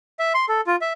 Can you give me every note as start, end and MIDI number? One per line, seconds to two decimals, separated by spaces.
0.19 0.33 76
0.34 0.46 84
0.49 0.61 69
0.67 0.76 65
0.81 0.93 76